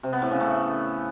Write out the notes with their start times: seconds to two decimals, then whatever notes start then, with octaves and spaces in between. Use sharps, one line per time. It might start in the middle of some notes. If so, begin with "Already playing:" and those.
0.03 C3
0.13 B3
0.22 A2
0.31 C#3
0.40 A3